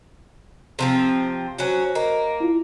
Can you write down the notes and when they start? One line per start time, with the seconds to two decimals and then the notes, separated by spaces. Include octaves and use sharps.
0.79 C3 F3 C4
1.58 F#3 C#4 F#4 C5
1.95 A#3 D#5
2.40 E4 F4